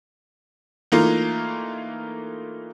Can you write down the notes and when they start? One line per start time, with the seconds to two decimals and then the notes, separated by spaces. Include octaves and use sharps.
0.92 E3 A3 A#3 D#4 F4